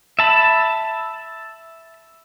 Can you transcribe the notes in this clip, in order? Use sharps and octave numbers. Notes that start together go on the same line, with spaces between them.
E5 A5 B5